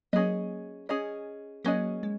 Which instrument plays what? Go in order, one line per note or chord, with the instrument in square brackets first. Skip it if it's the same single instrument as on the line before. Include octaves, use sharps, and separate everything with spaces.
[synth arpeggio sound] F#3 A#3 [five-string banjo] C#4 G#4 D#5
[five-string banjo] C#4 G#4 D#5
[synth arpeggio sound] F#3 A#3 [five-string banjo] C#4 G#4 D#5
[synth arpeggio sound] G#3